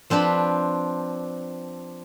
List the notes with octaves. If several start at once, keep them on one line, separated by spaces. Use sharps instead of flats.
F3 C4 D4 B4 B5